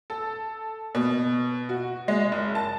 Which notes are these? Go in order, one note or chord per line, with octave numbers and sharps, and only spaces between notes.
A4
B2
F#4
G#3
F#1
A5